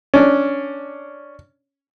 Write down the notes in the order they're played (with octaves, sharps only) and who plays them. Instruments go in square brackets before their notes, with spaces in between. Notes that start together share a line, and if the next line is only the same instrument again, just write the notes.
[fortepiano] C#4 D4